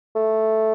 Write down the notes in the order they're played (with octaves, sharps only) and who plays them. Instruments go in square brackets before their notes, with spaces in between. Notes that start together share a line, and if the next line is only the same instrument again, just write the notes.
[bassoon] A3